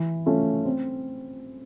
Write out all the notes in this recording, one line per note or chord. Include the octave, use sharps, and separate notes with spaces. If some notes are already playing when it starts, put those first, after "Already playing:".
Already playing: E3
A3 C#4 F4
C4